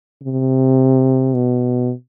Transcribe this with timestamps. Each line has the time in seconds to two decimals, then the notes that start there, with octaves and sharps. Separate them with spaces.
0.23 C3
1.34 B2